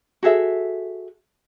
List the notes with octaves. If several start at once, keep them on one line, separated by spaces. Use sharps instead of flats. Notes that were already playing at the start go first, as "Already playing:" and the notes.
F#4 G#4 A4 E5